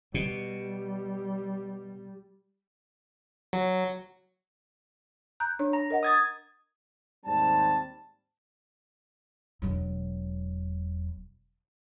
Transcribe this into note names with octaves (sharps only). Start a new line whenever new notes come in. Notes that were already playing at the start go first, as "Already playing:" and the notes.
B2 G3
F#3
A#5 F#6 G6
D4 C#5
A#5
A#4 D#5 F#5
D#6 G#6 A6
D#2 G#2 G3 C4 C5 A5
E1 F#3